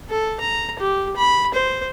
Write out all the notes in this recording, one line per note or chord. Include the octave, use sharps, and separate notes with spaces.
A4
A#5
G4
B5
C5